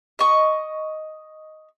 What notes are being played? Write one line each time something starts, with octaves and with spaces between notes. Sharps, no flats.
D#5 C#6